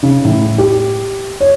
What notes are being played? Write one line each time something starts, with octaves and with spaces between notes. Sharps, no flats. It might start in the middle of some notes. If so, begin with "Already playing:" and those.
C#3
A2
G4
C#5